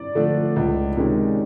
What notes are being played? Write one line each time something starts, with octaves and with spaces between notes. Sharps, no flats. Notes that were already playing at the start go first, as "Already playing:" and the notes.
Already playing: D5
D3 F3 A3 D4
C#2
C3 D#3 G#3 C#4